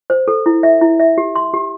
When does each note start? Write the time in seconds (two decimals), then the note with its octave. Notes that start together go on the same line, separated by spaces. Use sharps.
0.10 C5
0.28 A4
0.46 E4
0.63 E5
0.81 E4
0.99 E5
1.18 G4
1.36 C6
1.53 G4